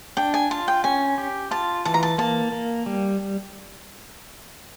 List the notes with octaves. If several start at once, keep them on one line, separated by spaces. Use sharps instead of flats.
D4 G5
G#5
F4 A5
G5
C#4 G#5
G4
F4 A5
E3 A5
A#5
A5
A#3 A5
A#3
G3